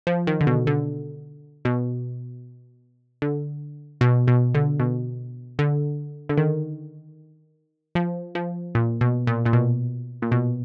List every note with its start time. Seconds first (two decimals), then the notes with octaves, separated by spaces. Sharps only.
0.07 F3
0.27 D#3
0.41 D3
0.47 B2
0.67 D3
1.65 B2
3.22 D3
4.01 B2
4.28 B2
4.55 D3
4.80 B2
5.59 D3
6.29 D3
6.38 D#3
7.95 F3
8.35 F3
8.75 A#2
9.01 B2
9.27 A#2
9.46 A#2
9.53 B2
10.22 A#2
10.32 B2